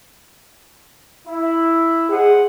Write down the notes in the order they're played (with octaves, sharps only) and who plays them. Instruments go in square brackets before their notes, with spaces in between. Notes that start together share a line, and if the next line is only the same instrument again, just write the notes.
[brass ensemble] E4
[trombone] G#4 [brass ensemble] C5 D#5 F#5